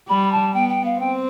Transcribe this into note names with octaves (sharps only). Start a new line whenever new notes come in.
G3 B5
A5
B3 G5
G5
F5
C4 G5